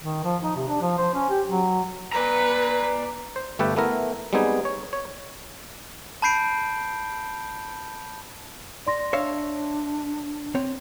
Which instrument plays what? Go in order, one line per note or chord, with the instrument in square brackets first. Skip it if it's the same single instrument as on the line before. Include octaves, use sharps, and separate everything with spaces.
[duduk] D#3
F3
D#4
C3
D4
F3
C5
C#4
G4
F#3
[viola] B4 [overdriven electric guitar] D5 A#5
[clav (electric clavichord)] C5
G1 A3 G4 A4 B4 G5
A3 B3 E4 A#4
G3 G#3 B3 C4 D#4 G#4
C#5
C#5
[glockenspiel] A5 B5 G6 C7 D7
[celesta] D5 C6 A#6
[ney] D4 [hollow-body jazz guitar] C#5 E5 F5
[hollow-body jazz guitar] C4 C#5